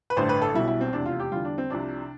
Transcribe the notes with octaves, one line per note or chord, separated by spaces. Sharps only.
B4
A1 G2 D3 C5
B4
A4
B1 B2 G3 E4
E4
C4
F1 E2 C3 D4
F4
G4
E2 D3 G3 F4
D4
C4
C2 C3 F3 D4